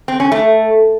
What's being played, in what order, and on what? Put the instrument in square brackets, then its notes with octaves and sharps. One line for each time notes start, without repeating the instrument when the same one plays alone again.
[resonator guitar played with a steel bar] C4
C#4
A3